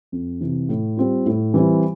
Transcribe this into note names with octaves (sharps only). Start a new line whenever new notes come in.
F2
C3 E3
A2
G3 C4 F4
A2
E3 G3 C4 E4